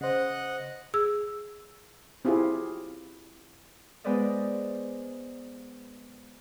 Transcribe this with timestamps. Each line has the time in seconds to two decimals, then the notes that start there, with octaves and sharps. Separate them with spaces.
0.01 C#3 C5 D#5 F#5
0.94 G#4 E6
2.25 C4 E4 F4 G4 G#4
4.04 G#3 B3 B4 C5 D5 D#5